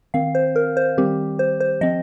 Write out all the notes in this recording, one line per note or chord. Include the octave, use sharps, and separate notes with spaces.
D#3 C4 F5
C5
A#4
C5
D#3 G3 C4 G4
C5
C5
F3 C4 D#5